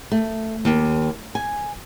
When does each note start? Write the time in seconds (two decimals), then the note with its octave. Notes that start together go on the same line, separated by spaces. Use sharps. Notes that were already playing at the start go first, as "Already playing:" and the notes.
0.12 A3
0.65 D#2
1.35 G#5